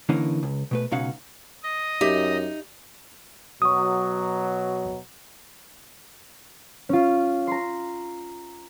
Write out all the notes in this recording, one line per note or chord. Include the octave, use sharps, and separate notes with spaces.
D3 E3 A#3 C#4 D#4
C#2
B2 A3 B4
C#2 B2 C#4 D#4 F5 F#5
D#5
F#2 D#4 G4 E5
B2 F#3 C#6 D#6
C#4 F4
A#5 C6